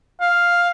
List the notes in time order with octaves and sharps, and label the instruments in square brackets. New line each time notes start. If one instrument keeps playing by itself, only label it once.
[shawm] F5